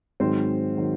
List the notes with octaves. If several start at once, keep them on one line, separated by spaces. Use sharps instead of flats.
G#2 D#3 F#3 C4 C5
D#3 F#3